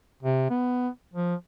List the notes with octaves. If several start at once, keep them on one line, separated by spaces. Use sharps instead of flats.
C3
B3
F3